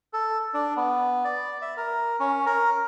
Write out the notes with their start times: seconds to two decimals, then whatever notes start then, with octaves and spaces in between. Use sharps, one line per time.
0.13 A4
0.54 D4
0.76 B3
1.24 D5
1.62 E5
1.77 A#4
2.20 C#4
2.46 A#4